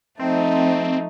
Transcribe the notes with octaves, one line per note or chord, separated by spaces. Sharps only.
F3 A3 C4 D#4